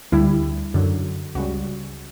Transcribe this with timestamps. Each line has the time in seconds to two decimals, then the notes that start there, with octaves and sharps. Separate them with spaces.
0.12 D2 D3 G3 E4
0.74 F#2 D3 F#3
1.35 C#2 C#3 G3 F#4